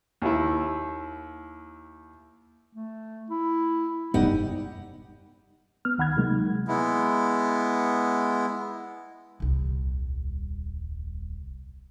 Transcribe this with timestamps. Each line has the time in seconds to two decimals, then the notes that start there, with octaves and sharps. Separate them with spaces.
0.22 D#2 E4
2.75 A3
3.30 E4
4.14 F1 G2 G3 B3 D#4 G4 F#5
5.85 B3 F6
5.98 D2 D#3 F#5 B5 F6 G#6
6.16 C3 F#3 G#3 A#3 D#4
6.68 G#3 B3 E4
9.40 D#1 C2